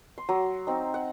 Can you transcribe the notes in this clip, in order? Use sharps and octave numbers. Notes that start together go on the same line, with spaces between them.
C6
F#3 A#5
C4 D#4
F#5